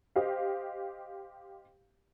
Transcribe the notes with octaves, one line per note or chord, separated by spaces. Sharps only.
G4 C5 D#5 F5